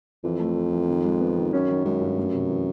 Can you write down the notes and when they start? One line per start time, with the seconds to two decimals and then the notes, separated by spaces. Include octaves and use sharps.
0.24 F2 E3
0.40 A3
0.56 C4
0.72 E3
0.89 D#3
1.05 G#3
1.21 B3
1.36 D#3
1.53 F#2 C#4
1.69 D#3
1.85 F#2 G#3
2.01 G2
2.17 A3
2.33 C3
2.49 E3